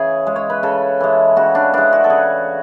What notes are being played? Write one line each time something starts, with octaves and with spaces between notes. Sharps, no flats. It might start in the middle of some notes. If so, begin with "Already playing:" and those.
Already playing: C#3 E3 G#4
G#3
C#5
B4
C#3 A4
E3 G#3
C#3 F#4
D4
E3 G#3 D4
F#4
A4
C#3 G#4